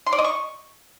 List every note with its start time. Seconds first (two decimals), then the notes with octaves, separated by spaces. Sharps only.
0.06 C6
0.12 D5
0.18 D#5
0.24 C#6